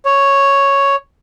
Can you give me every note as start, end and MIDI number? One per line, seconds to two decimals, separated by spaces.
0.05 0.96 73